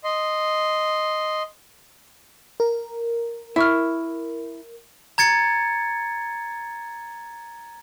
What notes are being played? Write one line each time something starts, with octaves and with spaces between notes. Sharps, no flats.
D#5 C6
A#4
E4 E5 C#6 F6
A#5 G#6 A6 C#7